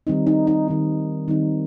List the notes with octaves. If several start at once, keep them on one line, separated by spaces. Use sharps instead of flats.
D#3 G3 C4 D#4
D#4
D#4
D#3 G3 C4 D#4
D#3 G3 C4 D#4